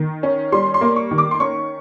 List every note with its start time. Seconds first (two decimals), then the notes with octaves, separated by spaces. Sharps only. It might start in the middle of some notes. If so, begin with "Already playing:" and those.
Already playing: D#3
0.23 C#4
0.52 G3 C6
0.74 C6
0.81 A#3
0.96 C#6
1.11 D#3
1.18 D6
1.31 C6
1.40 C#4 C#6